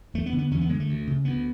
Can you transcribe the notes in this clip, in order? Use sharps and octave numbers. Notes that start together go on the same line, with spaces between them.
E2 A3
B3
D3
B3
E2 C#4
B3
D3 G#3
A3
D2
C#3
D2 B3